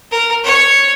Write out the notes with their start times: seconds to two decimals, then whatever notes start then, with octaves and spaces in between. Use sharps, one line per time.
0.11 A#4
0.44 C#5